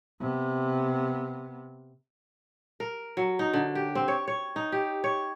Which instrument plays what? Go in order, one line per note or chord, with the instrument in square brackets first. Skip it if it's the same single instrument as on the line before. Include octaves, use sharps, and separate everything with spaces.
[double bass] C3 B3
[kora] A#4
F#3
D#4
D3
G4
C4
C#5
C#5
D#4
G4
C#5